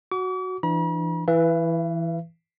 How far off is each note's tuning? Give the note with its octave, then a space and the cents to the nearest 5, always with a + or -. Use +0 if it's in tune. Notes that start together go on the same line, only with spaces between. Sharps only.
F#4 +0 D6 -45
E3 +25 D4 +25 B5 -45
E3 +0 B4 +0 E5 +45